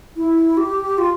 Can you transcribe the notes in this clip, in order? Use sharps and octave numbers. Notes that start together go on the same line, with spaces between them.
E4
G4
F4